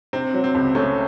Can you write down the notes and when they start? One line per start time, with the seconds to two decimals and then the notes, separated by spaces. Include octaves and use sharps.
0.13 C3 C4
0.34 F#3
0.44 C4
0.55 C#2
0.75 C3 A3 C#4